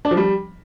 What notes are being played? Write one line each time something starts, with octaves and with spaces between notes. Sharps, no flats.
D4
F3
G3